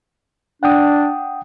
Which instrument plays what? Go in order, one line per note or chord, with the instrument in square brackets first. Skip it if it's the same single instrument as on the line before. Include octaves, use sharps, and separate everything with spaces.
[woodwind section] D4 [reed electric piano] F#5 G5 D#6